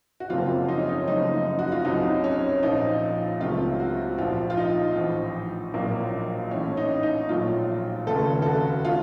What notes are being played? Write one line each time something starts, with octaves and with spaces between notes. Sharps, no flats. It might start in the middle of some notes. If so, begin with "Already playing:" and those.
F#4
F#1 F2 C3 F#3 A#3 F4
D#4
C#4
D#4
F#1 F#2 F3 A3 D#4
F#4
F4
C2 C3 F#3 D#4
C#4
A#1 A#2 F3 D#4
C#2 C3 F#3 A3 F4
F#4
A#1 A#2 F3 F4
F4
D#4
A1 A2 F3
A#1 A#2 F#3 A#3
A1 A2 A3 C#4
D#4
D#4
A#1 A#2 F#3 A3 F4
F1 D#2 C#3 A3 A4
A4
F#4
D#3 F4